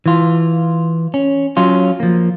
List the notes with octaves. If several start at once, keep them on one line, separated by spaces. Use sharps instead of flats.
E3 F4
C#4
F#3 C#4 F4
F3 A#3